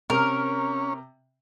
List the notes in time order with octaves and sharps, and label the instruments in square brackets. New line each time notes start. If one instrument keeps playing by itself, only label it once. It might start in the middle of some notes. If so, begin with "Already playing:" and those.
[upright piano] C3 [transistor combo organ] C#4 [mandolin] A#4